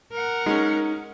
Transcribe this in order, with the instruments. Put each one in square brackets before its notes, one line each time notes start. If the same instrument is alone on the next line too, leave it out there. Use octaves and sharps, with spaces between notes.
[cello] A#4 F#5
[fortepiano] G#3 C#4 [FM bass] D#4